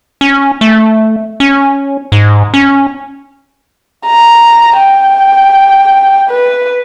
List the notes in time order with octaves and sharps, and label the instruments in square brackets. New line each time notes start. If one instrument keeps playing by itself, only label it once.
[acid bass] C#4
A3
C#4
G#2
C#4
[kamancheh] A#5
G5
B4